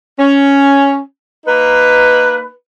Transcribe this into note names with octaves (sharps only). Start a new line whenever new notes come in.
C#4
A#3 D#4 B4